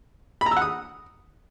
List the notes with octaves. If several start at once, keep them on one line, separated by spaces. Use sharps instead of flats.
B5
A#5
E6
F#5
D#6